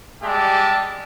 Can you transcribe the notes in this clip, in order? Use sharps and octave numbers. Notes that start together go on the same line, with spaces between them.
G3 G#3 G4 D5 E5 A5